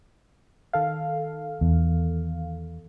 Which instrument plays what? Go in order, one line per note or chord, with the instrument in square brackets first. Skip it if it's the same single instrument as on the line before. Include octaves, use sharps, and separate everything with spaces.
[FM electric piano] D#3 A4 F5
[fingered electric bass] E2